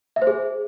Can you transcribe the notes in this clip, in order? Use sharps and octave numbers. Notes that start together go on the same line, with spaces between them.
E5
C5
G#4